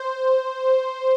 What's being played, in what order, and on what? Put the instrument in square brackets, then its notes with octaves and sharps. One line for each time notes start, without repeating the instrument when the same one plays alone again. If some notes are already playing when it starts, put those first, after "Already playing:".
Already playing: [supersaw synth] C5